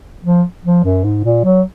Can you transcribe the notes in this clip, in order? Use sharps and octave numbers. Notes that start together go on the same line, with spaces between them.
F3
F3
F#2
G#2
A#2
F#3